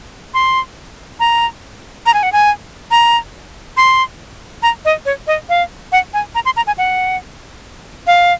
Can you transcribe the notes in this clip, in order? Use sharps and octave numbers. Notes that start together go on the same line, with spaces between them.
C6
A#5
A#5
G#5
F#5
G#5
A#5
C6
A#5
D#5
C#5
D#5
F5
F#5
G#5
A#5
C6
A#5
G#5
F#5
F5